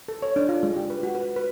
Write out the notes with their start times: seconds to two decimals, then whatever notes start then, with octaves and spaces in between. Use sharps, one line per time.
0.08 A4
0.22 C#5
0.36 D4
0.49 F4
0.63 G#3
0.77 G4
0.90 B4
1.03 F#4
1.15 B4
1.36 B4